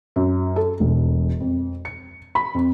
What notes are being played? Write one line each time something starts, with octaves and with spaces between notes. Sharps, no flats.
F#2
A4
E1
F2
C#7
B5
F2